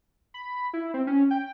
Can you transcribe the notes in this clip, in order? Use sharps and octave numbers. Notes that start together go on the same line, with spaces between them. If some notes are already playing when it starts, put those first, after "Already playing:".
B5
E4
C4
C#4
G5